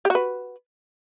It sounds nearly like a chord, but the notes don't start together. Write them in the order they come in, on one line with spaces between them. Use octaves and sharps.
G4 F#4 B4